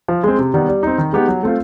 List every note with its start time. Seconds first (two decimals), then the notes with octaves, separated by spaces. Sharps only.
0.08 F3
0.24 G#3 C4
0.39 C3
0.54 D#3 G3 B3
0.68 G3
0.83 C4 D#4
0.98 D#3
1.13 G#3 B3 D#4 G4
1.28 F#3
1.43 A3 C4 F4